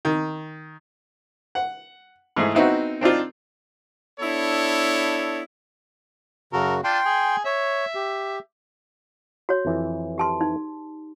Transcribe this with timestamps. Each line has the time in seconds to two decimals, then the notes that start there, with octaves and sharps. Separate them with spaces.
0.05 D#3
1.55 F#5
2.36 G#2 E3 A3 G#4
2.55 B3 C4 D#4 E4 F#4
3.01 C4 D4 D#4 F4
4.20 B3 D4 E4 A4 C#5
6.53 F#2 C#3 F#4 A4 A#4
6.84 D4 F4 G5 C6
7.05 G#4 G#5
7.45 C#5 E5
7.95 G4
9.49 F#4 C#5
9.65 F2 E3
10.18 G4 A5 C6
10.41 D#4